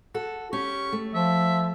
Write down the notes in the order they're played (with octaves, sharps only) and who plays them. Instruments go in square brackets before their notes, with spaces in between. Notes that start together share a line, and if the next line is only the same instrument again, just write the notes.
[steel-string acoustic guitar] F#4 A4
[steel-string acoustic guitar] C#4 G4 [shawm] C#6
[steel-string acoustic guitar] A3
[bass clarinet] F3 [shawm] E5